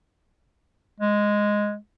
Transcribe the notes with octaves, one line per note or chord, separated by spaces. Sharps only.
G#3